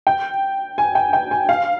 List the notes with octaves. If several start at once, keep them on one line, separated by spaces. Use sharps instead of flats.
G5
G#5
G5
G5
G#5
F5